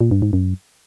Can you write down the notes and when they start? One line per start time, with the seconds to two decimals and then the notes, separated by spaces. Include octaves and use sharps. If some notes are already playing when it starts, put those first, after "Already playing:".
0.01 A#2
0.11 G2
0.22 G#2
0.33 F#2